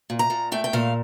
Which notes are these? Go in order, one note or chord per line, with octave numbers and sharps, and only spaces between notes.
A#2
A#5
A#2
A3 G5
G5
A#2 F5